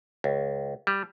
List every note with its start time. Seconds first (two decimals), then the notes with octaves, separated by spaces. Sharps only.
0.24 C#2
0.87 G3